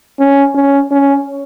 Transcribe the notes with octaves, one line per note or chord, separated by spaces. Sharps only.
C#4
C#4
C#4